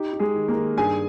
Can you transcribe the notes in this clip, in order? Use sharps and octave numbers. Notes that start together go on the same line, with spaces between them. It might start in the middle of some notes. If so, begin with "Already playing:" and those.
Already playing: D#4 G4
D#4
G#3 G#4
D#3
A#3 A#4
D#3
G2 G#4 G#5